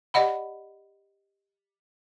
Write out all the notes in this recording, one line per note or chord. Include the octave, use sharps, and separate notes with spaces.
G4 D5 D#5 F#5 B5